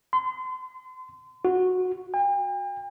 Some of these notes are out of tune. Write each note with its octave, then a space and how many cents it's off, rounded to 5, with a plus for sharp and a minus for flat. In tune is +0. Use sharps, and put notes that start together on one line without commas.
C6 -35
F#4 -10
G5 +45